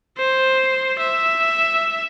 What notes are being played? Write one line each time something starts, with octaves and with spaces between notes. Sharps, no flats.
C5
E5